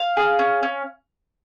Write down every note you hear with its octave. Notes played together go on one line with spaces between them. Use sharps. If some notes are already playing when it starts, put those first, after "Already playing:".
Already playing: F5
G#4
C#4
C#4